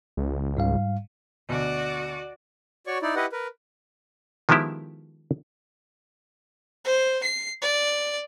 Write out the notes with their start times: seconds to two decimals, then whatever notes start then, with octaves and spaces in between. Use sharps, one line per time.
0.17 C#2
0.57 G#2 G3 F5
1.49 D2 B2 F#4 D5
2.87 F#4 C#5 D5 C#6
3.02 D#4 E4 D5
3.16 E4 G4 B4 D#5 F#5
3.32 A#4 B4
4.49 D#3 F3 G#3 B3 E4 G4
6.85 C5
7.23 C7
7.62 D5